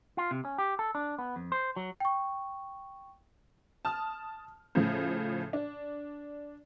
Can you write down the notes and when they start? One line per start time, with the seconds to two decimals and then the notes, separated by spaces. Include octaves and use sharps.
0.17 F4
0.31 C3
0.45 C#4
0.58 G4
0.79 A4
0.95 D4
1.19 B3
1.36 F2
1.52 C5
1.76 F#3
2.00 G5 C#6
3.85 A5 D#6 F6
4.75 A2 C#3 F3
5.53 D4